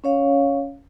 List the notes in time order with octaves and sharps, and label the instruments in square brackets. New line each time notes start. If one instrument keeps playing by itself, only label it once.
[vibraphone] C#4 C#5 F5